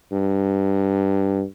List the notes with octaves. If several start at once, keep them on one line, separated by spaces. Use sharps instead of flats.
G2